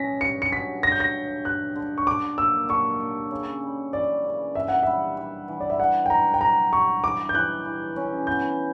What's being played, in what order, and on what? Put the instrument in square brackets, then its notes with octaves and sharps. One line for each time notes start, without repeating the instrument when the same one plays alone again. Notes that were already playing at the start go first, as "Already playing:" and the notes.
Already playing: [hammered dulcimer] C#4 [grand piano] A#6 B6
[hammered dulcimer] G2 [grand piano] C#7
[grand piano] C#7
[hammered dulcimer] F#3 [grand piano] B6
[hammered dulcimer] G2 [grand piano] A#6
[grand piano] G6
A#6
[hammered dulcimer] G2
[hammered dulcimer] G2 [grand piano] F#6
[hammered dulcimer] D3
[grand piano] C#6
[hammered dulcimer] D3 [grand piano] D6
[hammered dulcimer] A#3 [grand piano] E6
[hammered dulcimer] D3 [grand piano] C#6
[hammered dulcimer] A#3
C#3
G3
[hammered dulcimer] E3 [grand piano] D5
[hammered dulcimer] C#3
[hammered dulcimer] G2 [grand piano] E5
[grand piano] F#5
[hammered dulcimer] G3 [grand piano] E5
[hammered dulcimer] G3
E3
[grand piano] D5
E5
[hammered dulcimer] D4 [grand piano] F#5
[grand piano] G5
[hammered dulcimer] D3 [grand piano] A#5
[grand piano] G5
[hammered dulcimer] D3 [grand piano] A#5
[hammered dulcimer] D3 [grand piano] C#6
[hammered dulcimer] E3 [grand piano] D6
[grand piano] G6
[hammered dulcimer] E3 [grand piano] F#6
[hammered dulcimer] E3
C#4
[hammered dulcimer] B3 [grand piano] G6